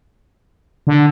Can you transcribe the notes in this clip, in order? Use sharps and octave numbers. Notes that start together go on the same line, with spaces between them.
D3